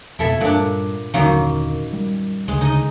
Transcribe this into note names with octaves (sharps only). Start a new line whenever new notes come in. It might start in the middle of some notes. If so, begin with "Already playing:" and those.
F2 B2 E4 A4 E5
G2 A#2 D4
D#1 F#2 D3 D#3 A#3
G3
D2 C#3 G#3
D#4 D#5